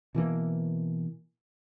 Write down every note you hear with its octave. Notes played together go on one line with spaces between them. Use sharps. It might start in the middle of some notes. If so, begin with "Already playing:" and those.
B2 E3 A#3